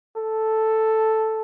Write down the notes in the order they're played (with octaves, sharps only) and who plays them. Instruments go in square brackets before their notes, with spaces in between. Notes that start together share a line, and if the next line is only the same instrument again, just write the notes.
[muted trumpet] A4